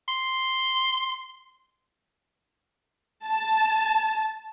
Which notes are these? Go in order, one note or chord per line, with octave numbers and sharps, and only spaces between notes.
C6
A5